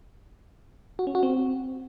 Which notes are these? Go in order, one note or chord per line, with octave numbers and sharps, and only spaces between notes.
F#4
C#4
F#4
C4